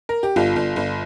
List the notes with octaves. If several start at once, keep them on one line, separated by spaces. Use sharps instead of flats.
A#4
G4
G1 F4
G1
G1